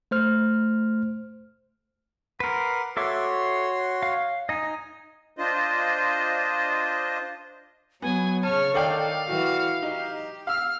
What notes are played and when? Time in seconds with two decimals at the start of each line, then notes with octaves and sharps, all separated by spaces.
0.11 A3 C5 F6
2.40 A#4 B4 F#5 C6 D6
2.97 F#4 A4 C#5 E5 C6 D6
4.03 F5
4.49 D#4 D#5 G#5
5.37 D4 F4 C5 D#5
8.02 F#3 B3 G#5
8.43 C#3 C#5 A5 F6
8.74 D#3 A4 D5 F5 G5
9.26 E3 F#4
9.83 D#4 G4
10.47 F5 E6 F6